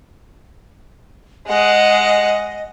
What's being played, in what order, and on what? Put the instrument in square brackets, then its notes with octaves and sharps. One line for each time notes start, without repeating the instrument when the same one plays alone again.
[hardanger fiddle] G#3 F#5 [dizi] D#5